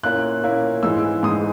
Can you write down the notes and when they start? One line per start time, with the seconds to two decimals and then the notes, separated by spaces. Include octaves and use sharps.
0.03 A#2 A#3 C#4 E4 F#6
0.43 A#2 A#3 C#4 E4
0.83 G#2 E3 G#3 E6
1.23 G#2 E3 G#3 D#6